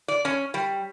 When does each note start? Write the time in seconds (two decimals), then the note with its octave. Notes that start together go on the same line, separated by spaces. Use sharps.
0.08 D5
0.25 C#4
0.54 G3